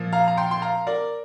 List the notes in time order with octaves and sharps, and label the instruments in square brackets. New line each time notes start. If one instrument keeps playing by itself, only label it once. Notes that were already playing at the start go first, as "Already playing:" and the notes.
Already playing: [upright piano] A#2 F3
F5 A#5
A#5
G5 C6
C6
F5 A#5
A#4 D5